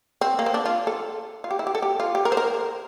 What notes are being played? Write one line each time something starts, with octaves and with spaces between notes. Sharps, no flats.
C4
A#3
C4
D4
F4
A4
F4
G4
E4
G4
A4
G4
F4
G4
A#4
C5
A#4